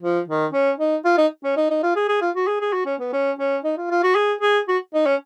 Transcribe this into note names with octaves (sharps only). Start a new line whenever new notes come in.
F3
D#3
C#4
D#4
F4
D#4
C#4
D#4
D#4
F4
G#4
G#4
F4
F#4
G#4
G#4
F#4
C#4
B3
C#4
C#4
D#4
F4
F4
F#4
G#4
G#4
F#4
D#4
C#4